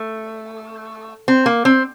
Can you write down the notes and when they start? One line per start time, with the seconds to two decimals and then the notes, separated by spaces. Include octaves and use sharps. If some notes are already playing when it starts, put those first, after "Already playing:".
Already playing: A3
1.28 C4
1.46 A#3
1.65 C4